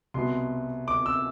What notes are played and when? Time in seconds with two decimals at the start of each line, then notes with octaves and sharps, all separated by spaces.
0.14 C2 B2 B3 C6
0.88 D6
1.06 E6